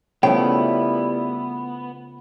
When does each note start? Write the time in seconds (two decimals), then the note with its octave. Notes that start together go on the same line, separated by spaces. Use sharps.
0.23 C#3 F3 G3 A3 B3 E4 G5